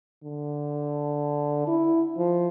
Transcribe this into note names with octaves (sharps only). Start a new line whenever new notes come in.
D3
E4
F3